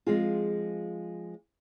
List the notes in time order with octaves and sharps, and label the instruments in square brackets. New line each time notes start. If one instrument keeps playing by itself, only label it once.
[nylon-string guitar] F3 G#3 C4 F4 G#4